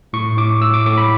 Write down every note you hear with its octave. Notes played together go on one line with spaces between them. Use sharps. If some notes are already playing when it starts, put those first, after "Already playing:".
A2 C#6
A2 D6
A2 E6
D6
A2 D6
B5